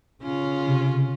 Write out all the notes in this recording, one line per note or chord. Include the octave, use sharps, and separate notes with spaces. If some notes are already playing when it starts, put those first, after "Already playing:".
C#3 C#4 F4
C3